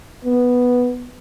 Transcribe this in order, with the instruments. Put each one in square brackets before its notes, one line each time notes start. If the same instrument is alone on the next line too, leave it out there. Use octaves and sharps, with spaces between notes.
[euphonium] B3